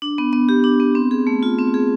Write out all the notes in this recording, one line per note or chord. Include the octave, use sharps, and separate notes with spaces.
D4
B3
B3
G4
D4
B3
C4
G#4
A3
F4
C4
G#4